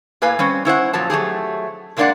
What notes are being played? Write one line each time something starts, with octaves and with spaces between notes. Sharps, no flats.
A2 A#3 B4 F5 G#5
G3 C4 C#4
C#4 E4 C5 F#5
A#2 F3 F#3 A5
F#3 A3 G4 G#4
C3 G#3 A#3 D4 D5 F#5